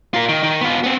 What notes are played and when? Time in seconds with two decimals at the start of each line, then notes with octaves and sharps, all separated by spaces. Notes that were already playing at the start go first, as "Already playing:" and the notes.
0.14 F4 A#4
0.29 D#3
0.43 D#3
0.61 B3 F4
0.84 B3 C4